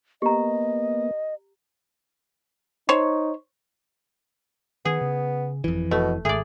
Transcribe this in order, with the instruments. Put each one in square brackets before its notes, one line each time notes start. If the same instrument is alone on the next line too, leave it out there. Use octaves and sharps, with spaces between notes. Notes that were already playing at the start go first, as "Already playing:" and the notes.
[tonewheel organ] A#3 B3 [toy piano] G4 A#5 [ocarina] D#5
[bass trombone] D#4 [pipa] C5 C#5
[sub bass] D#3 [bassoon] B3 [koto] G#4
[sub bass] C#3
[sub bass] G1 [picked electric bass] F2 E3
[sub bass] F1 [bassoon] B2 [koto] A3
[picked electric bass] G#1 [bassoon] A3 [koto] G#4 D5